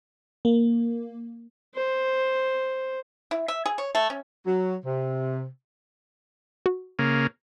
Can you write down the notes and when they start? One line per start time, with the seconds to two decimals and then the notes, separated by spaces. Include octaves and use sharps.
0.45 A#3
1.75 C5
3.31 E4
3.48 E5
3.66 G#4
3.78 C#5
3.95 A3
4.10 C#4
4.46 F#3
4.84 C3
6.66 F#4
6.99 C#3 A#3